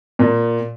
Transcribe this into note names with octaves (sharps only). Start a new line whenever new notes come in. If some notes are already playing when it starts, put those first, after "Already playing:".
A#2